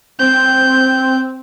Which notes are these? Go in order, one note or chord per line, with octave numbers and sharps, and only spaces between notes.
C4 G6